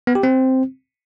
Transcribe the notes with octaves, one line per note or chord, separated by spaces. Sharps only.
B3
G4
C4